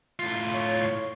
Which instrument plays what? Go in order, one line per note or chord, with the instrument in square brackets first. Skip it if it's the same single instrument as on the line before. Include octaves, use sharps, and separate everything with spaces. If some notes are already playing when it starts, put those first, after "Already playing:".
[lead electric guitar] A2 F4
[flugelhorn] C#5